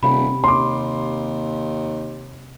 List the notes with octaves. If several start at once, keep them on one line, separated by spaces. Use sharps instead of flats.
D#1 C3 B5
D#2 C6 D6